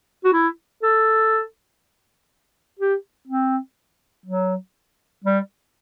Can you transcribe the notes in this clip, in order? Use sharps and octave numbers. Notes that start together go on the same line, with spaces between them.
F#4
E4
A4
G4
C4
F#3
G3